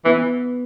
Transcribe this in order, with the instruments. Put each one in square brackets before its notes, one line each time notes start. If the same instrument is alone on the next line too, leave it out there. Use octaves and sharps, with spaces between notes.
[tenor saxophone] E3 [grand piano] B3